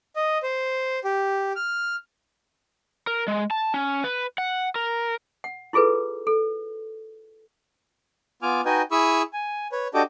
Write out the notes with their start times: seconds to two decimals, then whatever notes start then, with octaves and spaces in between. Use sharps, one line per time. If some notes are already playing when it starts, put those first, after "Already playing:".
0.16 D#5
0.43 C5
1.04 G4
1.56 F6
3.07 A#4
3.28 G#3
3.51 A5
3.74 C#4
4.04 B4
4.38 F#5
4.75 A#4
5.44 F#5
5.73 E4 F4 G#4 A4 B4
6.27 A4
8.42 B3 F4 G#5 D6 F6
8.65 D#4 F#4 B4 D#5 G5 G#5
8.91 E4 G#4 B5 C#6 D#6 E6
9.33 G#5
9.72 B4 C#5
9.94 D4 F#4 G4 A4 D#5 D6